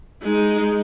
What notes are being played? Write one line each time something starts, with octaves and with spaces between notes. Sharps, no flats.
G#3 D#4